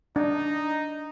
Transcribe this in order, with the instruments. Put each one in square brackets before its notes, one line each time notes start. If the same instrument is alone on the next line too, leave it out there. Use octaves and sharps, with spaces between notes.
[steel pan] D4 [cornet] D#4